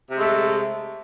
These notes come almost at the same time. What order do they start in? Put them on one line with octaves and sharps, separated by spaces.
C3 G#3 A3